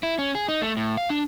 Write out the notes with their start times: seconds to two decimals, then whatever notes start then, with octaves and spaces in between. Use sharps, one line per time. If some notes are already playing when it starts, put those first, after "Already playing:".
0.03 E4
0.19 C#4
0.35 G#4
0.48 D#4
0.62 A3
0.77 A2
0.97 F5
1.10 D4